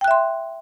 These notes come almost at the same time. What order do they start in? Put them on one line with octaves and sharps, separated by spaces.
G5 F#6 E5 C6